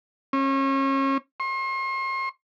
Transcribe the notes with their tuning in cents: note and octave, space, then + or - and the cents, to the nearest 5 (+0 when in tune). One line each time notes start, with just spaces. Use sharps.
C#4 -35
C6 +40